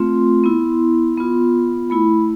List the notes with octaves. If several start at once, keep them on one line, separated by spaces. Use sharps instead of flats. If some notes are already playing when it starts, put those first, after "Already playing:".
Already playing: A3 C4 F4 C6
B3 E4
B3 F4
A3 E4 B5